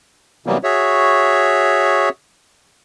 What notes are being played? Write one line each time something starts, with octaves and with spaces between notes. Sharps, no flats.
C3 E3 F#3 G3 A#3 B3
F#4 G#4 C#5 E5